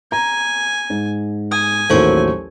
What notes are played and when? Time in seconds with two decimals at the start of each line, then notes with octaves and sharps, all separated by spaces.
0.12 G#5 A#5
0.90 G#2
1.52 G#5 D#6
1.90 A1 D#2 F#3 A4 C5 C#6